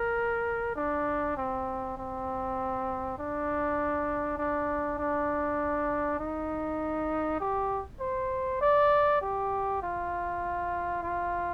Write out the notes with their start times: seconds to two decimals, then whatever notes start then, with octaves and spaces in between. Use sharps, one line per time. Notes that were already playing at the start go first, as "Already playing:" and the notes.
Already playing: A#4
0.76 D4
1.37 C4
1.97 C4
3.18 D4
4.38 D4
4.98 D4
6.19 D#4
7.40 G4
8.00 C5
8.61 D5
9.21 G4
9.82 F4
11.03 F4